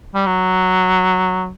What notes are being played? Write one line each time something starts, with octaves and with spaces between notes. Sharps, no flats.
G3
F#3